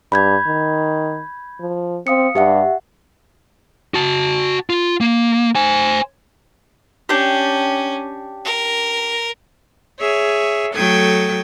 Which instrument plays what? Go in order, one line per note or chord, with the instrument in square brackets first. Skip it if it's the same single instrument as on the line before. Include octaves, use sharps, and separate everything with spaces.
[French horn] G2 [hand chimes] B5 G6 G#6
[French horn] D#3
F3
[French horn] C4 [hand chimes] F5 D#6 C#7
[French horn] G2 [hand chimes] G4 E5 F#5
[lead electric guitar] F#4 A5
F4
A#3
C5 G#5
[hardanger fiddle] C#4 [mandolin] D4 G4
[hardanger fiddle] A#4
[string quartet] G#4 C#5 E5
F#3 A3 A4 G5 D#6 G#6